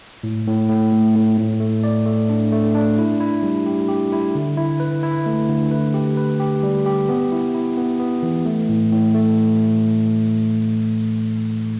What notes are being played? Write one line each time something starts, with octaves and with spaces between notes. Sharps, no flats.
A2
A2
A2
A3
A2
A2
A3
D5
A3
D4
A3
D4
E4
E4
G3
G4
G4
E4
D3
E4
B4
E4
A3
D3
B4
G4
B4
G4
G3
G4
B3
E4
E4
B3
B3
E3
A3
A2
A2
A3